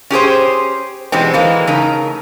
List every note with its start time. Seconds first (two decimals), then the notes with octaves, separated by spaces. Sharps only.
0.10 C#4 G4 G#4 C5
1.12 B2 E3 G3 G#3 C4
1.34 E3 G#3 A#3
1.67 C#3 A3 D#4 A#4